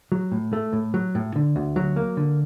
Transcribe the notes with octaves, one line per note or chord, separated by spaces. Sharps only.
F#3
A2
A3
A2
F#3
A2
D3
D2
F#3
A#3
D3